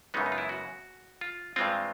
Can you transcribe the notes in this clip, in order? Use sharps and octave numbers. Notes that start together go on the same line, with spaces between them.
F#2 C#3 E3 G#3 B3 D#4
D#4
F4
E4
F#4
F4
G2 E3 G#3 C4 F4